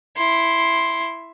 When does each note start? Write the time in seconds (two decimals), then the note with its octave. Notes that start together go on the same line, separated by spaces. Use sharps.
0.17 E4 C6